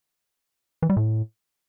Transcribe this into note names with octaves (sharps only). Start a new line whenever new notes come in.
E3
G3
A2